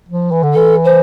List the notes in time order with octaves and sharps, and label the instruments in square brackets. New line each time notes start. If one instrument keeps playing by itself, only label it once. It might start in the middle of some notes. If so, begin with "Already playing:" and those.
[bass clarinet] F3
E3
D3
[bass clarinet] E3 [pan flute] A4
[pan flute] C5